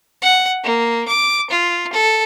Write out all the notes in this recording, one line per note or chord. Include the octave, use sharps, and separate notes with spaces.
F#5
A#3
D6
F4
A4